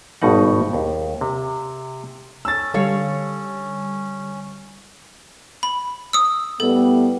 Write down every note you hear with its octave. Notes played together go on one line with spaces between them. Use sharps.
G#1 G2 B2 D#4 F#5
D#2
C3
C#4 E6 A6
D3 G3 A4 C#5 F5
B5
D#6 E6
A2 G3 B3 A4